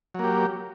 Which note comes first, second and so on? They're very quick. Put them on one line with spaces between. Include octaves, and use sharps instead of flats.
F#3 A#3 G4